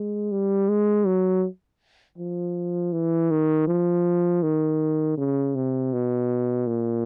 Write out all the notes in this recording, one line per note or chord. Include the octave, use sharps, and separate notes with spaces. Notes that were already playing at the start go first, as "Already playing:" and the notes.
Already playing: G#3
G3
G#3
F#3
F3
E3
D#3
F3
D#3
C#3
C3
B2
A#2